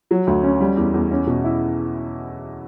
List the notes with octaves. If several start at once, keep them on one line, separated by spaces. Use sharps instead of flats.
F#3
D2
C#4
G3
E2
E2
C#4
B2
E4